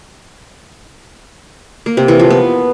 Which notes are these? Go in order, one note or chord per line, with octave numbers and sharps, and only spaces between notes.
A#3
C3
E3
F3
B3